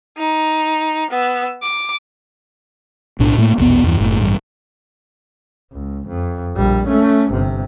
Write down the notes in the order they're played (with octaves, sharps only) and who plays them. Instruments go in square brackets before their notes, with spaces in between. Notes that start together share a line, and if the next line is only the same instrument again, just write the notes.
[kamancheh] D#4
B3 E6
D6
[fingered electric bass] B1 A2 D4
A2 A3 A#3
A#1 E2 B2 B3
E2 G2 E3
F#1 A2
A1 G2
[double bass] C#2
F2
A#1 G3
A3 C#4
G1 C3